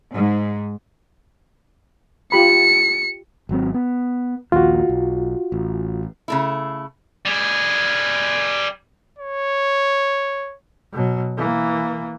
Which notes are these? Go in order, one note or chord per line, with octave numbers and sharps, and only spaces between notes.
G#2
F4 G4 B5 C#7
G#1 F#3 C4
B3
A#1 D#2 A#2 F4 F#4
B1
A1
C#3 A3 E4
G3 G#4
C#5
B2 F#3
E3 A#3